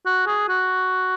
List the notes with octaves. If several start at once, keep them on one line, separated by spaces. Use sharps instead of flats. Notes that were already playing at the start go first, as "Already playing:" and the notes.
F#4
G#4
F#4